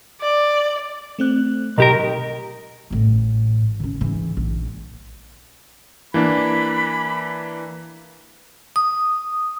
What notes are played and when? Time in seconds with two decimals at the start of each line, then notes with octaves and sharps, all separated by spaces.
0.21 D5
1.19 A3 C4 F#6
1.78 B1 D#3 G4 A#4 A#5
2.90 A1 A2
3.80 D#3 C#4
4.01 G#2 E3
4.37 A#1
6.14 E3 A#3 D4 B5
8.76 D#6